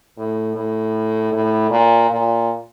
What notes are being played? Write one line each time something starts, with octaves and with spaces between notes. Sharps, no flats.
A2
A2
A2
A#2
A#2